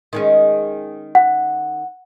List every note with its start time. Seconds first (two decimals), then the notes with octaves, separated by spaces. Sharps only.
0.13 D#3 G#3 C#4
1.15 F#5